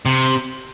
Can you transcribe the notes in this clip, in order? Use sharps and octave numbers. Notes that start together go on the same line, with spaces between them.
C3